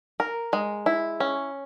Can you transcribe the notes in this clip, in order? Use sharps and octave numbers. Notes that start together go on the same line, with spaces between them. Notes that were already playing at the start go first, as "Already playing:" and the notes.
A#4
G#3
E4
C#4